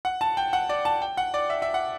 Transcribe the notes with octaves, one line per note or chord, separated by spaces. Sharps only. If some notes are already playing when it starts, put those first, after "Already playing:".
F#5
A5
G5
F#5
D5
A5
G5
F#5
D5
E5
E5
F#5